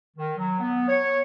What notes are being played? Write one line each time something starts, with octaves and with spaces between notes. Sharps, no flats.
D#3
F#3
B3
C#5